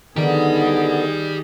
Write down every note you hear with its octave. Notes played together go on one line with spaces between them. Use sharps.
D3 D#3 B3 G4 G#4 D5 D#5